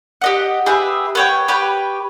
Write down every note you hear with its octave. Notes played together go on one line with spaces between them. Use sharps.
G4 D#5 F#5
G4 G#4 B4 E5
B3 C#5 G5
G4 B4 C#5 G5